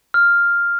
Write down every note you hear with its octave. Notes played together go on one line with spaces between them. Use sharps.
F6